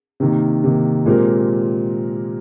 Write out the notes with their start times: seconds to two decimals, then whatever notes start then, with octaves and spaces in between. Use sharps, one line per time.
0.20 C3 D#3 A#3
0.64 C3 D#3 A#3
1.06 A#2 G#3 C4 G4 A#4